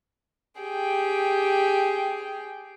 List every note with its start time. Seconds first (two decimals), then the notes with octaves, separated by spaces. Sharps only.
0.60 G4 G#4 G5